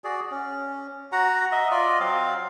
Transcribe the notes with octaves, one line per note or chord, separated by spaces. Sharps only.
F#4 G#4 D5
C#4
F#4 F#5 A#5
D#5 E5
F4 D5 D#5
F#3 C4 F5